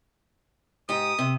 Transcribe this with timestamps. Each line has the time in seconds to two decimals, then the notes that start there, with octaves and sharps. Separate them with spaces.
0.89 G#2 G4 D#6
1.19 C3